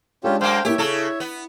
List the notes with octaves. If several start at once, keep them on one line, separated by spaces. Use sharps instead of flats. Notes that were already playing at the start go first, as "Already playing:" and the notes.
G#3 C#4 D4 F4 G4 A4
F#2 A#3 C5 F5 G5
A#3 B3 E4 G4 C#5 E5
C#3 E4 A4
B3